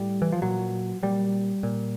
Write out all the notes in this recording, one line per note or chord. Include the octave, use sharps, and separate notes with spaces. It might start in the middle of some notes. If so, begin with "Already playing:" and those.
Already playing: A2 G3
E3
F3
A#2 F#3
A#2 G3
A#2